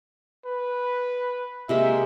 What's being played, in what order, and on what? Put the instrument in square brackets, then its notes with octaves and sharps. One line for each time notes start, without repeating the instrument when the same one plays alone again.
[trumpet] B4
[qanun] C3 G#3 A#3 [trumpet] E5